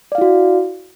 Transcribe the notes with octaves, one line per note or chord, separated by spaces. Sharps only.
E4 F#4 D5 F5